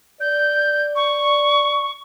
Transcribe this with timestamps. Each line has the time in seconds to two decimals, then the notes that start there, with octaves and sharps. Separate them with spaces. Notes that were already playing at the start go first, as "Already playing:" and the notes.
0.21 D5 G6
0.96 C#6